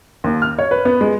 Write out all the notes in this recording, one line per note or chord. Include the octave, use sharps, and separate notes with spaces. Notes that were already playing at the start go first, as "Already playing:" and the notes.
D#2
F6
C#5
B4
B3
G#3